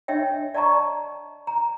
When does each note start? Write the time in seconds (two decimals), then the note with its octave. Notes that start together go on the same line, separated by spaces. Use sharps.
0.08 D4 C#5 D#5 E5 G5
0.54 D5 D#5 A5 A#5 C#6
1.47 A#5